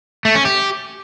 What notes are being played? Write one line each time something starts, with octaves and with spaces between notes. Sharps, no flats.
A3
C#4
G4